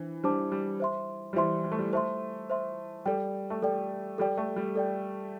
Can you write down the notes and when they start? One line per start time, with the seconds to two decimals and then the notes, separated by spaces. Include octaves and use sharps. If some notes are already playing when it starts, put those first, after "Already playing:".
Already playing: E3 D4 C5
0.24 G3 D4 C5 A5 D6
0.52 G3
0.80 C5 E5 C6
1.33 G3
1.36 E3 C5 E5 C6
1.64 G3
1.72 A3
1.79 G3
1.93 A3 C5 E5 C6
2.50 C5 E5 C6
3.06 G3 A4 D5 G5
3.50 A3
3.62 G3 A4 D5 G5
4.18 G3 A4 D5 G5
4.38 A3
4.56 G3
4.75 A4 D5 G5